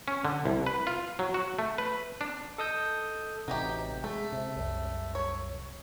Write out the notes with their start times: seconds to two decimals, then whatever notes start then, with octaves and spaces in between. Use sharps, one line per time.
0.08 C#4
0.25 D3
0.45 C2
0.66 B4
0.87 F4
1.19 F#3
1.34 F#4
1.59 A3
1.78 B4
2.21 D4
2.58 A4 D#5 D#6 E6 G6
3.48 A1 C3 F#3 D#4 G4
4.04 G#3 A3
4.32 C3
4.56 C2 F#2
5.15 C#5